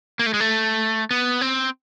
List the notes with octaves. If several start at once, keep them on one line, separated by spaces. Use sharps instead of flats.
A#3
A3
G#3
A3
B3
C4